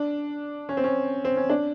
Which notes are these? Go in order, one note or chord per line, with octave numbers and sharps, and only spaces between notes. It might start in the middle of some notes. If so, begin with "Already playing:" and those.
Already playing: D4
C#4
C4
C#4
C4
C#4
D4